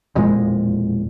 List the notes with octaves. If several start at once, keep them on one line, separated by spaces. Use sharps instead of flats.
E1 F2 A#2 G#3